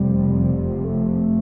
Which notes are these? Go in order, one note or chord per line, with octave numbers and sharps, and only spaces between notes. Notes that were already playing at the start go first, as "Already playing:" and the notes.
Already playing: F1 F2 C3 G3
A3